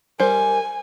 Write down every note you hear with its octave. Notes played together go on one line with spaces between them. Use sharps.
G3 A#4 C5 G#5